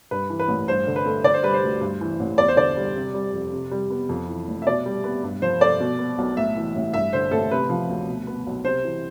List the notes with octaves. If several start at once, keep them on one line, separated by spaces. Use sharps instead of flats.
G2 B4
E3
B4
A1
G2 C5
D3
B4
A3
D3 D5
C5
G3 B4
C5
D2
G2
E3
A1
E2 D5
C5
D3 D5
G3
C3
G3
F2
C3
G3
B3
F2
E3
F1
E5
B2 D5
G3
B3
G2
F3 C5
A3 D5
B2
B3
B1
A2 E5
E3
A1
G2 E5
D3 C5
A1 A4
C3 B4
F3
D2
B2
B3
B1
C3 C5
E3